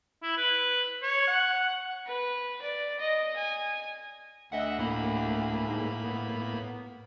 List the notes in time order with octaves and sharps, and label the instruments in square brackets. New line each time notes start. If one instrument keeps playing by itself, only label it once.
[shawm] E4
B4
C#5
F#5
[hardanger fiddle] B4
D5
D#5
G#5
[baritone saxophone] D2 [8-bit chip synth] D#5 E5 F#5
[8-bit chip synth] A2 A#3 B5
[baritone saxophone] G#2
B3